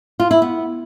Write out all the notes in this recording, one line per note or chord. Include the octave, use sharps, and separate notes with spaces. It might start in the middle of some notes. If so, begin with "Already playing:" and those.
F4
E4
B3